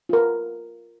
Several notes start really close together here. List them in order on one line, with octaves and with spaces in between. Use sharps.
F4 A#4 B4